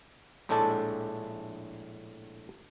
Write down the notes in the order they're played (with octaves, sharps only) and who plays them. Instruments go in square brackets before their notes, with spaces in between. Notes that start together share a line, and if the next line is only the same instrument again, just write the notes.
[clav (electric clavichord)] A#1 A2 G#3 A3 D4 A4